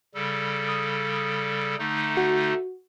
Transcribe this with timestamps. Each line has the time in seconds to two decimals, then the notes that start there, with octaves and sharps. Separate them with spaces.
0.15 C#3 G3 A4
0.69 D#6
1.79 D3 A3 D#4
2.17 F#4